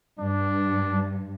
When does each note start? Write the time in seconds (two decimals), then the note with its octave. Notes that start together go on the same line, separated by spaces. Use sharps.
0.19 G2 D4